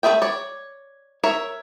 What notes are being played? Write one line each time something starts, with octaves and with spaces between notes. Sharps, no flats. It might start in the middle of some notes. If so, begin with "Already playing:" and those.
A3 F4 G#4 E5 G5
C#5 D5
A#4 C#5 E5